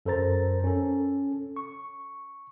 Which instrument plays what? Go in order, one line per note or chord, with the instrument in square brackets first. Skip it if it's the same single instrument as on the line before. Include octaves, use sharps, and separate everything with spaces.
[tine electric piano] F#2 A4 A#4 C5 A#5 A6
C#4 A4
C#6